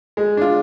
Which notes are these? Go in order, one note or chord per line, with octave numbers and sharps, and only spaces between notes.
G#3
D4 F4